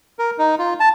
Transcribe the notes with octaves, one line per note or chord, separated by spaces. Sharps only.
A#4
D#4
F4
A5